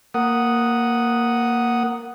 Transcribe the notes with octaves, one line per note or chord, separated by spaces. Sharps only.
A#3 F#5 D#6